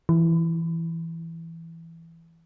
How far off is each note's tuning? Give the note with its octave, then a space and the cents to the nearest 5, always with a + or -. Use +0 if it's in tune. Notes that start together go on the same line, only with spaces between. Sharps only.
E3 +5